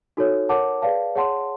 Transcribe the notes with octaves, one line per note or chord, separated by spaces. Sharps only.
D#4 F#4 A4 C#5
A#4 C#5 F#5 A5 D6
G#4 B4 D5 F5 A5
G#4 C#5 F#5 A5 C6